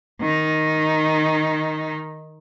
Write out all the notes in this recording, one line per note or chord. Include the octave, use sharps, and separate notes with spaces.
D#3 D#4